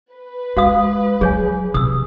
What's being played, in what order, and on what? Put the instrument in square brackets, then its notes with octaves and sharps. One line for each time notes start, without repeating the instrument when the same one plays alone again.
[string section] B4
[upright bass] G#3 [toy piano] F#4 F5 D#6
[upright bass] F#3 [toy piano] G#4 C#5 G#5
[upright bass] C3 [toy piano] D#6 E6